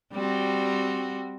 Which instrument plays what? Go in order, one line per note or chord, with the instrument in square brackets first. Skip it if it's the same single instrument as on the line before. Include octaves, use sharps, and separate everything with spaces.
[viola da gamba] G3 C4 F#4